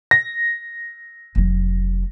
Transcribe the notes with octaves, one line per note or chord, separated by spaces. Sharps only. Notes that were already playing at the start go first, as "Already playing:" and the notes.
A#6
F1 F#3